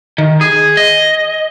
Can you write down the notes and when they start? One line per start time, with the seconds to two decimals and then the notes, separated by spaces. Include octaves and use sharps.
0.18 D#3
0.41 G#4
0.77 D#5